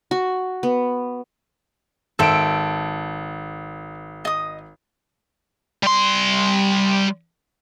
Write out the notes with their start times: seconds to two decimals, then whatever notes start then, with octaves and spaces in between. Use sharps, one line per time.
0.11 F#4
0.63 B3
2.19 G#1 A4 C5 E5 D7
4.25 D#5 D#6
5.83 G3 C6